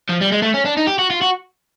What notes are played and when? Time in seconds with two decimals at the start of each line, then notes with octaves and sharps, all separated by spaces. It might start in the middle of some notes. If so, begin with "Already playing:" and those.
0.09 F3
0.21 G3
0.32 G#3
0.43 A3
0.54 C#4
0.66 D4
0.77 D#4
0.87 G4
0.99 F#4
1.10 F4
1.21 F#4